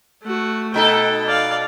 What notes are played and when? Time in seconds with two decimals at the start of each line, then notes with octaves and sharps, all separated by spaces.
0.22 A3 F#4
0.74 B2 D#4 A4 G5
1.26 D5 F5